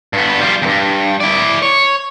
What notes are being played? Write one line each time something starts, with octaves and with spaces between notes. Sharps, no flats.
G2 B3
G3 F4
E2 G2
E4 D5
C#5